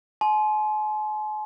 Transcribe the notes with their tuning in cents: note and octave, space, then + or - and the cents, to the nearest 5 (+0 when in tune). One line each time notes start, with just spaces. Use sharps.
G#5 +45 C6 +0